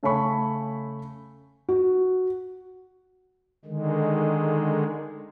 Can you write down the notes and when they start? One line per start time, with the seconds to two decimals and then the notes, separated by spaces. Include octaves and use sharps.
0.03 C#3 A3 C#5 G#5 B5 C#6
1.69 F#4
3.65 D3 D#3 G#3